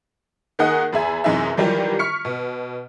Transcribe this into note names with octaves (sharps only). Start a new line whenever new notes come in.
D#3 A#3 D#4 G#4 F#5 D#6
E2 G#4 E5 G#5
F#2 C3 E3 D#4 G#4 E5
D#3 E3 F#3 G3 F4 G4
C#6 F6 B6 C#7
B2